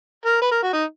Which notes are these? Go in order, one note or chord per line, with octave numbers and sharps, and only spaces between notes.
A#4
B4
A#4
F#4
D#4